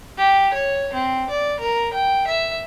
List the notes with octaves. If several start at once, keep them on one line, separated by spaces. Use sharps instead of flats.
G4
C#5
C4
D5
A#4
G5
E5